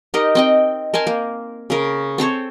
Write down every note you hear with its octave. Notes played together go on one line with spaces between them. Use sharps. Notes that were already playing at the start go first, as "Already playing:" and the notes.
D#4 G4 A#4 D#5
C4 D#5 G5
A#4 C5 G#5 A5
A#3
C#3 A#4
C4 A4 C5 C#5